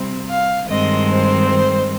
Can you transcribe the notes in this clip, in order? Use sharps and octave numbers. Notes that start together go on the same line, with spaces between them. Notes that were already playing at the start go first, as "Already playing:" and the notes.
Already playing: C3 G3 C4
F5
G2 D#3 G#3 C4 D#5
C5
C5